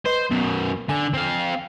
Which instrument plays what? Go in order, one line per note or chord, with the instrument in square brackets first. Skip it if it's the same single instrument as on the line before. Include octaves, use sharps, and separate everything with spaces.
[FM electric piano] B4 D#5 C6 [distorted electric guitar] C5
[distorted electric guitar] F#2 B2 [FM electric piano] B3
[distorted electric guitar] D3 [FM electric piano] G#5
[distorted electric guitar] C4 F5